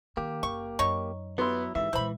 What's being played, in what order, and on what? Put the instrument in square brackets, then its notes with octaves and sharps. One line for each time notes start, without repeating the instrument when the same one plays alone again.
[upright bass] D#3 [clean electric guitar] A#3 G4
[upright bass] F#1 [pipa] C#6
[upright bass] F#2 [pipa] D#4 C#5 C#6
[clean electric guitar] F#3 E4 [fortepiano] B3 C6
[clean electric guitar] G#2 E3 [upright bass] C#4 [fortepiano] E5
[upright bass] A#2 G#3 [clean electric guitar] E3 [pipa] C5 B5